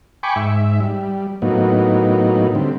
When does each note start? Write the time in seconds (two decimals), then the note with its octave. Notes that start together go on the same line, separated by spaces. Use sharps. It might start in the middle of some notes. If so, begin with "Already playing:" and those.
0.23 G5 G#5 B5 C#6 D6
0.36 G#2 E5
0.80 G3
1.42 A2 F#3 A#3 B3 D#4
2.55 D3 G3 C4